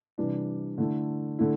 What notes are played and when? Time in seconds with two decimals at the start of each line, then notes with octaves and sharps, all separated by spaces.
0.18 C3 E3 G3 D4
0.78 D3 A3 E4
1.39 D3 A3 E4